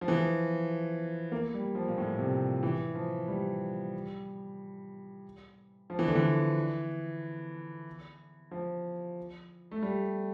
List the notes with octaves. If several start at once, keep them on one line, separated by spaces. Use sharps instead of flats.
F3
E3
F3
A#3
G3
F3
A#2
A2
C3
E3
F3
G3
F3
E3
D3
E3
F3
A3
G3